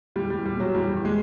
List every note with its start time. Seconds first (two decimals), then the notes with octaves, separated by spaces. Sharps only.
0.16 E2 G3
0.30 G3
0.35 E2
0.46 G3
0.55 B2
0.60 F#3
0.75 E2 G3
0.95 E2
1.05 G#3